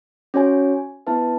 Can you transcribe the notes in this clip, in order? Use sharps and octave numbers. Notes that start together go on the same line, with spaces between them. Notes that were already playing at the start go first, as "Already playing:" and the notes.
C#4 F#4 C#5 G#5
B3 E4 B4 E5 A5